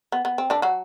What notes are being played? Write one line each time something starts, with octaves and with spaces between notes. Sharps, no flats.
B3
B3
C4
D3 D4
F#3 F#4